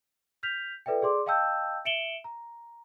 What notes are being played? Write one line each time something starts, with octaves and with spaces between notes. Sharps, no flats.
F6 G6 B6 F7
F4 A4 B4 D5 E5 G5
G#4 D5 C6 D6
D#5 F5 G5 A5 E6 G6
E5 C#7 D7 E7 F#7 G7
A#5